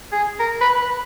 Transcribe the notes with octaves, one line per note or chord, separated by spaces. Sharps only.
G#4
A#4
B4
B4